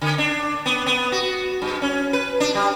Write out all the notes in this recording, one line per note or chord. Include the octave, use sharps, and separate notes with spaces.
D3
D4
B3
B3
F#4
G2
C#4
B4
D4
G3